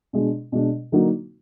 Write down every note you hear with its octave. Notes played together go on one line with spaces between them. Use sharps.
B2 G#3 D4
B2 G#3 D4
D3 F#3 A#3 D#4 F#4